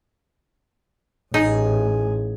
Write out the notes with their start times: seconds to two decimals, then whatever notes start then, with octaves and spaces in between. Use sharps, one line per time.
1.34 A1 D#4 G#4